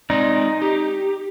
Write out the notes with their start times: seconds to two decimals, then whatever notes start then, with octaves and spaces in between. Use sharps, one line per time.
0.10 G#3 C4 D#4 D5
0.62 G4